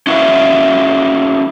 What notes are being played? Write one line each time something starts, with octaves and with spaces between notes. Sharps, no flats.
C#4 E4 F#4 B4 E5 F5